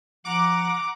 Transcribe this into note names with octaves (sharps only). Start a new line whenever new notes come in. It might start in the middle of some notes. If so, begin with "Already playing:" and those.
F3 F#5 A#5 D6